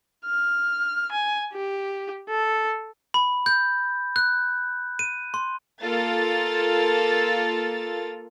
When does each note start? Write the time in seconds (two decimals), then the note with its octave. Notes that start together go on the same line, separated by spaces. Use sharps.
0.26 F6
1.12 G#5
1.53 G4
2.29 A4
3.14 B5
3.46 G6
4.16 F#6
4.99 D#7
5.34 C6
5.83 A#3 F4 A4 A6